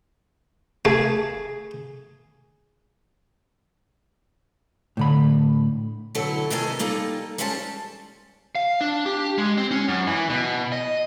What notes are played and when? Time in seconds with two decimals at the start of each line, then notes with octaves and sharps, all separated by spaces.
0.85 A3 G#4
4.97 A2 D3 B5
6.15 B2 D3 F#3 E4 A4
6.50 G2 C3 D#3 A4 D#5 G#5
6.79 G3 A#3 D#4 A4
7.38 G3 G#3 C#4 C5 F5 A5
8.55 F5
8.81 D4
9.06 G4
9.38 G#3
9.58 C4
9.71 C#4
9.89 F#2
10.07 E3
10.30 B2
10.72 D#5